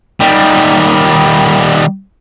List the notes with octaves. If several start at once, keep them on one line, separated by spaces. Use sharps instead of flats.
D#3 G3